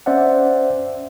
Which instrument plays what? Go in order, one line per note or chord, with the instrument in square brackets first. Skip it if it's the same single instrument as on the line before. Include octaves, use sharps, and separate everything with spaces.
[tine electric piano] C#4 C5 D5 E5 F#5